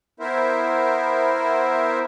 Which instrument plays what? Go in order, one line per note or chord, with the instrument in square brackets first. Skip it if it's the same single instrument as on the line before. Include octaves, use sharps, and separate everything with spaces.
[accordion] B3 E4 A#4 C5 E5